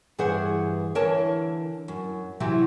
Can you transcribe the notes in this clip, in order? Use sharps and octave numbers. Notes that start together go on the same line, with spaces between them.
G2 E3 G#4 B4 C5 F#5
D3 E3 A#4 C#5 A5
F#2
C3 E3 F#3 C4 G4